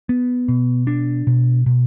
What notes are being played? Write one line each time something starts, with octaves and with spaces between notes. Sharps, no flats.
B3
B2
D4
B2
B2